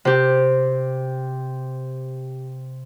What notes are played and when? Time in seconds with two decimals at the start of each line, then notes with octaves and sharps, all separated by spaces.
0.05 C3 G4